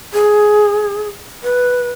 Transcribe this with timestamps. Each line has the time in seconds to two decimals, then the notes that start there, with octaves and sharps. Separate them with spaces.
0.13 G#4
1.44 B4